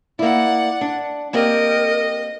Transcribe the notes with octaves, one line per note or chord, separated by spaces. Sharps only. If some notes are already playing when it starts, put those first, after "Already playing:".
A#3 E4 D5 F#5
D4
A#3 C4 G4 A#4 D#5